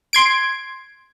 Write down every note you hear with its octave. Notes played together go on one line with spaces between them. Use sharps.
C6 G#6 D7